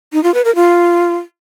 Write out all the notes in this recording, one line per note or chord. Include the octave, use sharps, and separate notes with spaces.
D#4
F4
B4
A#4
F4